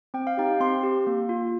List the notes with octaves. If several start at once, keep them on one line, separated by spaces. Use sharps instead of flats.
C4 G5
F5
D#4 G4 G5
C4 C6
G4
A#3
F4